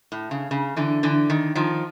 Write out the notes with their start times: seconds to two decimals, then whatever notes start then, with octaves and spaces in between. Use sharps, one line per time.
0.12 A2
0.31 C#3
0.51 C#3
0.77 D3 E3
1.03 D3 E3
1.30 D#3
1.55 D#3 F3